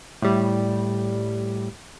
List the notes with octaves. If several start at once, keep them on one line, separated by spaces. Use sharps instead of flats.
A2 G3